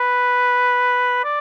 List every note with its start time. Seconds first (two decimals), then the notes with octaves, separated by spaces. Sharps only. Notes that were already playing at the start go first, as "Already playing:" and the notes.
Already playing: B4
1.25 D5